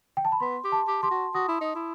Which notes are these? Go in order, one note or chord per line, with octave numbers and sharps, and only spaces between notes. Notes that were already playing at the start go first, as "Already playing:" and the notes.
G5
A5
B5
B3 C6
G4
A5
G4
G4 C6
F#4
F#4 D#6
E4
D#4
E4